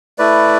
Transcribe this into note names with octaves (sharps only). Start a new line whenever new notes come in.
A3 E4 B4 D5